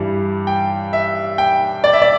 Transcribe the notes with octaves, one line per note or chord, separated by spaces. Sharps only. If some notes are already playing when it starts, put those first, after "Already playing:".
Already playing: G2 E3 G3
G5
E5
G5
D5
E5
D5